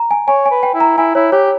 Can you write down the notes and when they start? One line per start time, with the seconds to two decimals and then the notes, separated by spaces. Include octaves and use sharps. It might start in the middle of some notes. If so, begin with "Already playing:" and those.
Already playing: A#5
0.11 G#5
0.28 C#5 G#5
0.46 G#5
0.51 B4
0.63 G5
0.75 E4
0.80 A#5
0.98 E4 G#5
1.15 E4 C#5
1.32 G4 C#5